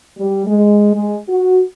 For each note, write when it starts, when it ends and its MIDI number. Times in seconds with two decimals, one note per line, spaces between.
0.18 0.44 55
0.46 0.91 56
0.93 1.15 56
1.28 1.60 66